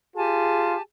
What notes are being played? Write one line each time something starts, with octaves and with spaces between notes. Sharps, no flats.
F4 G4 G#4 G#5 A5